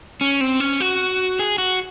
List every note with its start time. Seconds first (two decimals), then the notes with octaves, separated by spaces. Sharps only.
0.21 C#4
0.41 C4
0.60 C#4
0.81 F#4
1.39 G#4
1.58 F#4